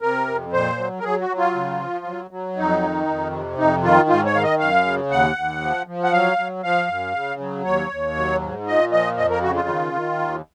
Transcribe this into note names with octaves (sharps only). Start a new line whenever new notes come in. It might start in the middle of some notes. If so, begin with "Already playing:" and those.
C3 A#4
F2
A#2 C5
F#3
A#4
F#3 G#4
F#4
F#3
F4
C#3
F3
F#3
F#3
F2 D#4
D#3
F2
C3
F2 D#4
D#3 F4
G#2 F4
C#5
D#3 F5
D#5
F#2 F5
C#3
D#2 F#5
D#2
F3
F3
F#5
F#3 F5
F#3
F3 F5
F#2
C#3
F#3
D#2 C#5
D#2
F#3
G#2
A#2 D#5
F3 D#5
F2 D#5
A#4
C#3 F#4
F4
D#3
D#3
D#2